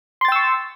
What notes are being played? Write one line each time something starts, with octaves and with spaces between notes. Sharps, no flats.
G5 C6 C#6 E6 A6